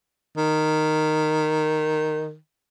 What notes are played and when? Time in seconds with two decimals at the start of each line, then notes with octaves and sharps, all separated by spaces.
0.37 D#3